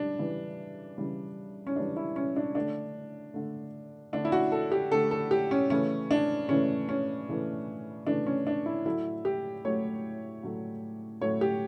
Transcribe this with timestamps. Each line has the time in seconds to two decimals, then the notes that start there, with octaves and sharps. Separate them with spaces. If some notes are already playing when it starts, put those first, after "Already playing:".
Already playing: G3 D4
0.19 C#3 E3 G3
0.98 C#3 E3 G3
1.67 C#4
1.76 C#3 E3 G3 D4
1.96 E4
2.16 C#4
2.36 D4
2.55 D3 A3 D4
3.34 D3 A3
4.13 D3 A3 D4
4.25 E4
4.32 F#4
4.52 A4
4.72 G4
4.92 D3 A3 A4
5.11 A4
5.31 G4
5.51 C#4
5.70 C#3 E3 A3 C#4
6.11 D4
6.49 C#3 E3 A3 C#4
6.89 C#4
7.29 C#3 E3 A3
8.07 C#3 E3 A3 D4
8.26 C#4
8.47 D4
8.66 E4
8.86 A2 F#3 A3 E4
9.25 G4
9.65 A2 F#3 A3 C#5
10.43 A2 F#3 A3
11.21 A2 F#3 A3 C#5
11.41 G4